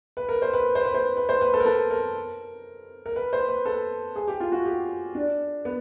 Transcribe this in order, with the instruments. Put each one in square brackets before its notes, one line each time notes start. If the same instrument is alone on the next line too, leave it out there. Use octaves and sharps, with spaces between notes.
[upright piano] B4
A#4
C5
B4
C5
B4
C5
B4
C5
B4
A4
A#4
A4
A#4
A#4
B4
C5
B4
A4
G#4
G4
F4
F#4
G4
D4
B3